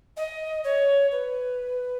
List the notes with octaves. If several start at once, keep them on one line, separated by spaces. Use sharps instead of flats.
D#5
C#5
B4